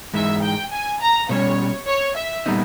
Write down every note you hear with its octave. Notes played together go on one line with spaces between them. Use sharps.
G#2 E3 G#3 D#4 E5
G5
G#5
A#5
B2 G3 C#4 C#5
C#5
E5
A#2 G3 B3 D#4